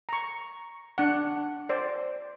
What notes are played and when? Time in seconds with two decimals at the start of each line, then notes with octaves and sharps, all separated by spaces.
0.09 A#5 C#6
0.98 D4 F#5
1.69 C5 D5